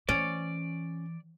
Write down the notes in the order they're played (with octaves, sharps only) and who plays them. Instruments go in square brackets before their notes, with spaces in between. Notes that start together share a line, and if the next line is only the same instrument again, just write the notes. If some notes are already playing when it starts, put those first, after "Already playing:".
[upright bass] E3 [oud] C#4 [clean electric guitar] D5